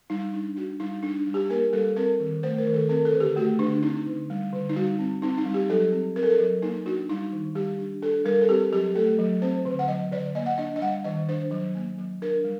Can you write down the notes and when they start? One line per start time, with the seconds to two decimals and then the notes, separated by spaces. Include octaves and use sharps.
0.10 G3 D#4
0.34 D4
0.56 D4 F#4
0.80 G3 D#4
1.03 D4
1.27 G3
1.34 G4
1.50 A#3 A#4
1.73 G3 A4
1.97 C4 A#4
2.20 D#3
2.43 A3 C5
2.58 A#4
2.66 D#3
2.74 A4
2.89 C4 A#4
3.05 A4
3.13 D3
3.20 G4
3.36 A3 F#4
3.59 D3 D4
3.83 C4 D#4
4.07 D3
4.30 G3
4.53 D3
4.69 D#4
4.76 G3 F#4
4.99 C4
5.22 C4 D#4
5.38 D#4
5.45 G3
5.54 G4
5.69 F#3 A4
5.92 C4
6.16 C4 A#4
6.23 A4
6.30 A#4
6.38 F#3
6.62 A#3 D#4
6.86 D4 F#4
7.09 G3 D#4
7.32 D#3
7.55 G3 G4
7.79 D4
8.02 D4 A4
8.25 G3 A#4
8.41 A4
8.48 C4 G4
8.72 F#3 G4
8.95 A3 A4
9.18 F#3
9.42 C4 C5
9.65 D3
9.79 F#5
9.88 F#3 D#5
10.12 D3 D5
10.35 A#3 D#5
10.46 F#5
10.58 D4 D#5
10.76 D#5
10.81 G3 F#5
11.04 D#3 D#5
11.29 D4 C5
11.51 F#3
11.75 A#3
11.98 F#3
12.22 D4 A#4
12.44 G3